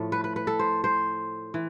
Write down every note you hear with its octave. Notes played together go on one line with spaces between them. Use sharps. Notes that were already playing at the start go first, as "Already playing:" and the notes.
Already playing: A2 F3 A3
B4
B4
B4
A4
C5
C5
E3